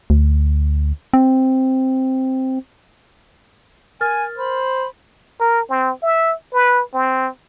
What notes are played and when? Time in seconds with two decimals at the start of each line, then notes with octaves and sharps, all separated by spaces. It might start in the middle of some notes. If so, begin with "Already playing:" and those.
0.10 D2
1.13 C4
4.01 A#4 G#5 F6 A6
4.38 C5 B5
5.41 A#4
5.70 C4
6.03 E5
6.54 B4
6.95 C4